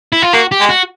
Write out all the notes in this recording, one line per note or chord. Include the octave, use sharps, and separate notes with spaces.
E4
F4
A#3 F#4
G4
G#3
F#4